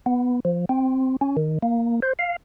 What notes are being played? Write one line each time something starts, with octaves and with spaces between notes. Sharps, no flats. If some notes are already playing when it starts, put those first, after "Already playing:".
B3
F3
C4
C#4
D#3
A#3
C5
F5